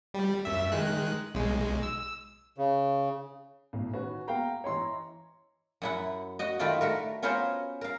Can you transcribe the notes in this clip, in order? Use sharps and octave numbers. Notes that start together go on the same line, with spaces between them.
G3
F#2 E5
D#3 G#3 F#6
B1 G#3
E6
C#3
B1 A2 E3
D#3 C#4 F#4 B4
G#3 A#3 B3 F5 G5 A#5
E3 E4 C#5 D#5 A#5 C6
F#2 E4 F#5
F#4 D#5
D#3 A3 E4 F4 D5
A3 F#4 A#4
B3 C#4 F4 A#4 C5 C#5
A#4 F5